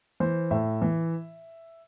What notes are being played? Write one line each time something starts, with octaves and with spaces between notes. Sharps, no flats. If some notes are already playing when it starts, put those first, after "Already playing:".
E3 C5
A2 E5
E3